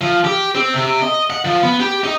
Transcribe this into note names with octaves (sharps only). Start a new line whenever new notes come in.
F3
G4
C4
C3
D#5
F#5
F3
B3
G4
D#4